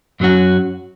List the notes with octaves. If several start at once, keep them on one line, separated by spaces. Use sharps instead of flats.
F#2 F#3 C#4 F#4